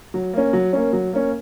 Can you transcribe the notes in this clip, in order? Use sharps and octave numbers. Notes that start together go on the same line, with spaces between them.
F#3
A#3 C#4
F#3
A#3 C#4
F#3
A#3 C#4